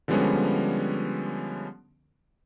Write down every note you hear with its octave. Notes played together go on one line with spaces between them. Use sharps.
D3 F3 G3 G#3 B3 C#4